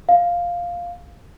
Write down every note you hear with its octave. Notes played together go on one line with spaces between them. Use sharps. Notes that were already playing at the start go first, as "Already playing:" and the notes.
F5